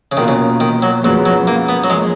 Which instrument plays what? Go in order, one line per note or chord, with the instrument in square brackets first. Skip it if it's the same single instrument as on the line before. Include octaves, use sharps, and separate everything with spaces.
[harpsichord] C#3
[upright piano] B2 A#3 F4 A#4 [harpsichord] D#3
[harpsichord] C#3
D#3
F#3
[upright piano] F#2 F3 G#3 B3 [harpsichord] F#3
[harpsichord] F#3
A#3
B3
F#3
[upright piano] F3 A#3 C#4 G#4 [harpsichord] G#3